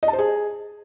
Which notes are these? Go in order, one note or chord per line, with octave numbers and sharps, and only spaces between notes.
D#5
A5
C5
G#4